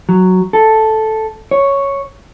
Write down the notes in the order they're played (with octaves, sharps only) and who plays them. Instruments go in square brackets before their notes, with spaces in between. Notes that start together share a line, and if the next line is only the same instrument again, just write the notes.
[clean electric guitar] F#3
A4
C#5